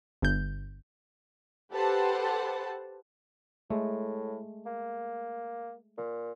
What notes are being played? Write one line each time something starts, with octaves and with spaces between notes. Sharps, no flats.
G1 G6
G4 A4 B4 C5 F#5 A5
A2 G#3 A3
A#3
A#2